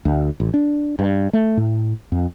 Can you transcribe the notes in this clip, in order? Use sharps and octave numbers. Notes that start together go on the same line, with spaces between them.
D2
A1
D4
G2
A3
A2
F2